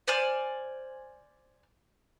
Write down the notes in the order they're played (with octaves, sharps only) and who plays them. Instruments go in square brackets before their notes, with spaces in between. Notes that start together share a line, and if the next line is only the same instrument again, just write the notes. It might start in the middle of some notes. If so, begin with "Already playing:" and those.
[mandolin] C5 D5 G#5 F6